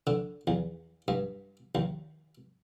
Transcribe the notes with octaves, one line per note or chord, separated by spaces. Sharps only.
D3
E2
G2
D#2